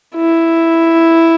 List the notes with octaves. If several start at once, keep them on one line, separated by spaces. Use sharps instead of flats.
E4